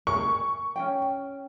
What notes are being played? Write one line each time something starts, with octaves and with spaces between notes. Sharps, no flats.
G#4 A#4 C#6
C#4 D4 G5